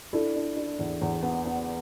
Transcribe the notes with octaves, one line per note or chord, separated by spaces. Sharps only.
D4 E4 A4
D4
D4
E2
E2
B3
B3